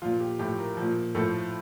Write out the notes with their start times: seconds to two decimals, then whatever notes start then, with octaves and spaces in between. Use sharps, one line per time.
0.02 A#2 F3 F4
0.20 G4
0.39 A2 F3 G4
0.59 A#4
0.77 A#2 F3
1.15 A2 F3 A4